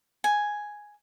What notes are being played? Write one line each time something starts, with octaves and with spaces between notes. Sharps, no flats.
G#5